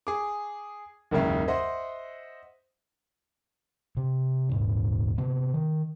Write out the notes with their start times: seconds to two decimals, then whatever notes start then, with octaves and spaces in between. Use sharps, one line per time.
0.07 G#4 D6
1.11 F#1 D#2 G#2 C#3 E5
1.48 C5 D#5 E5 F#5 C6
3.97 C3
4.49 D#1 G#2
5.18 C3 B3
5.54 D#3